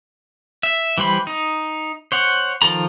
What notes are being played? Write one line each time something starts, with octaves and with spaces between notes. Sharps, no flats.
E5
E3 G3 C5 B5
D#4
C5 C#5 F#5
D#3 F3 A4 A#5